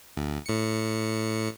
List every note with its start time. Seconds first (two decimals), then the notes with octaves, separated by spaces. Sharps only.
0.17 D2
0.46 A2 C#7